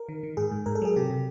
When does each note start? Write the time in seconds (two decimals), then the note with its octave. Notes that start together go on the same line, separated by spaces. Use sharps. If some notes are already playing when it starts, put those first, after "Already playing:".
Already playing: A#4
0.09 D#3
0.23 D#3
0.37 G#2 G#4
0.52 G#2
0.66 G#2 A#4
0.75 A4
0.82 F#3 G#4
0.96 C3 G4
1.10 C3